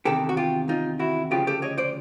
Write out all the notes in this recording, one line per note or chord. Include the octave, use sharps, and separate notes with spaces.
E2 C3 D#3 G4 A4
F#4
F4 G4
D#4 F4
E4 F#4
D2 C#3 F3 F4 G4
G4 A4
C#5 D#5
C5 D5